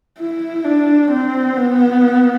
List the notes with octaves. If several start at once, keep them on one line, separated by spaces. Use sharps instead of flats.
E4
D4
C4
B3